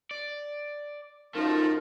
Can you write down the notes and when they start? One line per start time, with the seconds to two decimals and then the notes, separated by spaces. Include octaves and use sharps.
0.11 D5
1.35 F#2 F3 A3 D#4 F4 A#4